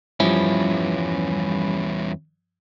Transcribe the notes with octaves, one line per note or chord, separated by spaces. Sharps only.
E2 G2 E3 F3 G3 C#4 E4